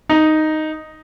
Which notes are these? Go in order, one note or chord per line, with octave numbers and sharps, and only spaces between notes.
D#4